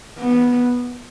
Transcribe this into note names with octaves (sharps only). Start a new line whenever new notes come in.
B3